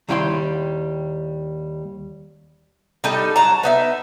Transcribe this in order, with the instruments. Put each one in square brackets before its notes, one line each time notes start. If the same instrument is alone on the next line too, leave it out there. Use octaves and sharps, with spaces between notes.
[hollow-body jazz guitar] D#2 G3 E4 G5 B5 C6
[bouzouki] G3 D#4 A4
F#3 A5 A#5
B3 D#4 E5